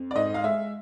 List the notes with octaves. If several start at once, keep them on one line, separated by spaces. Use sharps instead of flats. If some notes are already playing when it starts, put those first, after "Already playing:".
Already playing: F2
D5
G#2 D#5
F5
G#3 E5